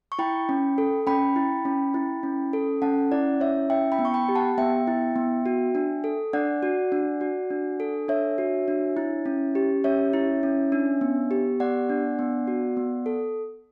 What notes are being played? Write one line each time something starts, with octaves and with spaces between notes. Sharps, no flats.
C#6
E4 G5 B5
C#4
A4
C#4 G5 B5
E4
C#4
E4
C#4
A4
C#4 F#5 A5
E4 D5 F#5
C#4 C#5 E5
E4 E5 G5
G5 B5
B3
C#6
G5 B5
G4
F#5 A5
B3 E5 G5
E4
B3
F#4
D4
A4
D4 D5 F#5
F#4
D4
F#4
D4
A4
D4 C#5 E5
F#4
D4
E4
C#4
G4
C#4 C#5 E5
E4
C#4
D4
B3
G4
B3 D5 F#5
D4
B3
F#4
B3
A4